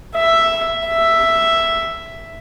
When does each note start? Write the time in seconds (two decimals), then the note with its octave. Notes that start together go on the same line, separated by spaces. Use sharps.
0.15 E5
0.85 E5